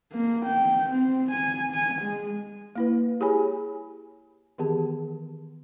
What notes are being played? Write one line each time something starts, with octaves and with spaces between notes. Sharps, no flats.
A#3
G5
C4
G#5
G#5
G#3
A#3 E4 B4
E4 G4 G#4 C#5 G#5 B5
D#3 E3 B3 G4 G#4 A5